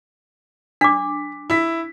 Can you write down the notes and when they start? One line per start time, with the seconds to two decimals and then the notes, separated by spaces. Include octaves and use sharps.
0.81 D4 D6 B6
1.50 E4 B6